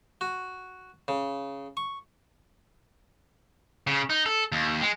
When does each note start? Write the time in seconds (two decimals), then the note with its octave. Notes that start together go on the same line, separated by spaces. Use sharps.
0.21 F#4
1.08 C#3
1.77 C#6
3.87 C#3
4.10 D#4
4.26 A4
4.52 D#2
4.81 G#3